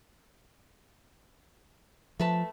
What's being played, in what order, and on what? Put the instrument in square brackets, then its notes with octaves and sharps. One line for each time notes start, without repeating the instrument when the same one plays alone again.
[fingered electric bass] F3 [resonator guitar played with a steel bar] A3 B4 A5